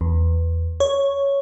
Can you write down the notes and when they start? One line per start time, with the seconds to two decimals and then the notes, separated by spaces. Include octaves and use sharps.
0.01 E2
0.80 C#5